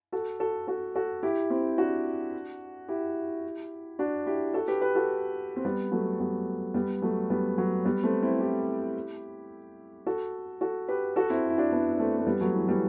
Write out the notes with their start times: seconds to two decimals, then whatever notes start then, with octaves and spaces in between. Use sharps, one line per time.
0.12 F#4 A4
0.40 F#4 A4
0.67 F#4 A4
0.95 F#4 A4
1.23 E4 G4
1.50 C4 E4
1.78 D4 F#4
2.88 E4 G4
3.99 D4 F#4
4.26 E4 G4
4.54 F#4 A4
4.68 G4 B4
4.81 G4 B4
4.95 F#4 A4
5.56 C4
5.64 G3 B3
5.92 F#3 A3
6.20 G3 B3
6.74 G3 B3
7.02 F#3 A3
7.30 G3 B3
7.58 F#3 A3
7.85 G3 B3
8.03 A3 C4
8.22 C4 E4
8.40 E4 G4
10.06 F#4 A4
10.61 F#4 A4
10.88 G4 B4
11.16 F#4 A4
11.30 C4 E4
11.49 E4
11.58 D4 F#4
11.72 B3 D4
11.93 D4
11.99 A3 C4
12.18 A3
12.26 G3 B3
12.41 F#3 A3
12.54 E3
12.68 E3 G3